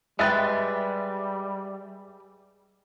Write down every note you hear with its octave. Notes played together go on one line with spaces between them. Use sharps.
G3 G#3 B4 E5 G5 A6